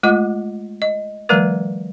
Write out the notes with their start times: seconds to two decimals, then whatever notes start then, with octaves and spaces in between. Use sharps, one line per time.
0.03 G#3 A3 F4 D#5 D6
0.82 D#5
1.29 D#3 F3 G3 A3 A#4 B4